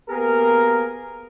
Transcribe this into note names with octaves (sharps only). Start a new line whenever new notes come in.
A#3 B3 G4 G#4 A#4